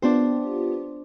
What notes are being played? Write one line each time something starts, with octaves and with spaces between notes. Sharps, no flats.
B3 D4 F4 G4 C5